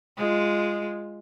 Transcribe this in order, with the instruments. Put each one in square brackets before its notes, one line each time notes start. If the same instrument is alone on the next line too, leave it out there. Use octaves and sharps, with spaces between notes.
[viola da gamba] G#3 F4